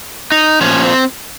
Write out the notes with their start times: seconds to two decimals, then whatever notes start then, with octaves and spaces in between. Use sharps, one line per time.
0.32 D#4
0.61 A#2 F3 C#4
0.83 C4